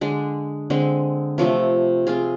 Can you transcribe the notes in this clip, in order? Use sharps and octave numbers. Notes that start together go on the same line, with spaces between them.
D3 G#3 D4
D3 G#3 C4
C3 F3 A3 C4
C4 F4 G#4